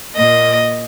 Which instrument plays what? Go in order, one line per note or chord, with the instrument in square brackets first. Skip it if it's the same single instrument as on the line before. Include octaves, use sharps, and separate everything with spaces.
[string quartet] A#2 A#3 D#5